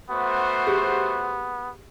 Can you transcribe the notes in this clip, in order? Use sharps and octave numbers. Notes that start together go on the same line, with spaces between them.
A3 B3 F#4 C5
G4 G#4